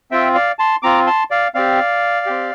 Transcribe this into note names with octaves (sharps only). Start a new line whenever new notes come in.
C4 F4 E5 G5
D5 F5
A5 C6
C4 F4 A#5 D6
A5 C6
D5 F5
C4 G4 D5 F5
C4 G4